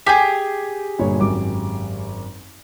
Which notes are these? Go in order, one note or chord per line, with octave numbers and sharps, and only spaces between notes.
G4 G#4 G#5 G6 C7
G1 A#2 C#5
G#1 F#2 D6